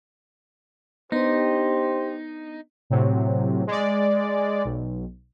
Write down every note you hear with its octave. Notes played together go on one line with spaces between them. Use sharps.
B3 D4 D#4 G4 C5
A2 C3 F#3
G#3 D5
B1